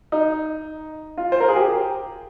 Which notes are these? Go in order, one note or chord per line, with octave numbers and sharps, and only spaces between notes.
D#4
F4
C5
A#4
G#4
G4